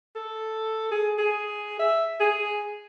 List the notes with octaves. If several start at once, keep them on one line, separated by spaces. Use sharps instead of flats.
A4
G#4
G#4
E5
G#4